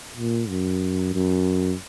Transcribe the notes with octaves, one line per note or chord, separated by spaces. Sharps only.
A#2
F#2
F#2